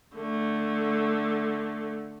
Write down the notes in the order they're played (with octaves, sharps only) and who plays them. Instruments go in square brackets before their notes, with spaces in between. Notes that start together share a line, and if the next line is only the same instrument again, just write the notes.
[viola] D3 A3